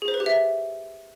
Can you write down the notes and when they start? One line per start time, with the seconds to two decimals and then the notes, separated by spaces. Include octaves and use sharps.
0.02 G#4
0.08 C5
0.14 B4
0.20 G4
0.26 E5